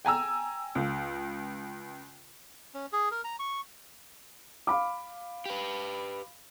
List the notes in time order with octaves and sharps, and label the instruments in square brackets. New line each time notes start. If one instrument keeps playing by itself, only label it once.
[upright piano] G5 G#5 A#5 E6
C#2
[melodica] C#4
G#4
A#4
A#5
C#6
[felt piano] F5 B5 D6
[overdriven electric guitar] G4 B4